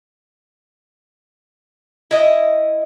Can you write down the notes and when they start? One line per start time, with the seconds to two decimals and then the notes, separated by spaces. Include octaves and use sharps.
2.11 E4 D#5